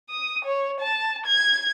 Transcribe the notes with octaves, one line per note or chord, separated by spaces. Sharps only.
D#6
C#5
A5
G#6